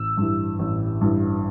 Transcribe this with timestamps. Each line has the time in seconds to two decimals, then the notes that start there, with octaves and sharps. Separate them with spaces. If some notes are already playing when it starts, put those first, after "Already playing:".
Already playing: A1 E6
0.17 G2 E3
0.59 A1
1.01 G2 E3